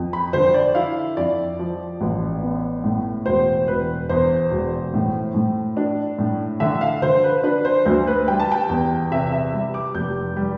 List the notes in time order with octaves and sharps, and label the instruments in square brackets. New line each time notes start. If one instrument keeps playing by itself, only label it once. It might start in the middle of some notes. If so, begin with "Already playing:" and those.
Already playing: [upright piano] F2
B5
D3 C5
D5
E4 F5
F2 D5
F3
A1
B3
A2
E1 C5
E1 B4
E2 C5
E1
A2
A2
D4
A2
D3 E5
F5
D3 C5
B4
D4 B4
C5
D2 C5
B4
G3 G5
A5
G5
E2
C3 E5
E5
G3
D6
F1 G6
G3